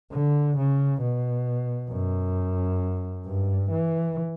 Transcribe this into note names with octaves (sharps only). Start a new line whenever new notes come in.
D3
C#3
B2
F#2
G2
E3